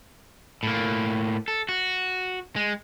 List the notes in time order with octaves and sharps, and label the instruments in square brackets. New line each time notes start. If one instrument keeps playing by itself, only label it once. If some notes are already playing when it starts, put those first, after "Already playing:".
[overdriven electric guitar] A2 A#3
A4
F#4
G#3